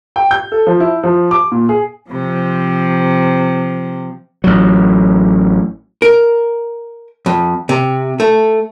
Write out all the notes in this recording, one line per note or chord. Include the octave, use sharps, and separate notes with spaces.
G5
G6
A4
F3
E4
F3
D6
A#2
G#4
C3 F3
A1 F#3
A#4
F2
C3
A3